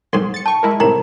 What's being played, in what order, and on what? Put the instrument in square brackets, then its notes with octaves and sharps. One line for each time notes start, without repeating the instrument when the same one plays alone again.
[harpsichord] B1 G#2 [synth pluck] C6
[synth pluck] A6 C#7
[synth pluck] G5 C#6 [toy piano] A5
[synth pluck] G#3 E4 A#4
[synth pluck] A2 C3 [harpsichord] D#3 [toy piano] A#5